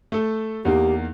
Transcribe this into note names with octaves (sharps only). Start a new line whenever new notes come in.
A3 A4
E2 A#3 D#4 G4